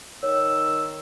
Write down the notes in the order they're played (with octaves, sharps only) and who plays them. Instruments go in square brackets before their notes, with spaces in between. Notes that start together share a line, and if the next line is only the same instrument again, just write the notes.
[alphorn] D#3 [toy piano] C#5 [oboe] E6